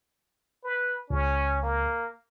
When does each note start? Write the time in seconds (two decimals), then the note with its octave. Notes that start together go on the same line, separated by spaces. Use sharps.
0.64 B4
1.10 C#2 C#4
1.63 A#3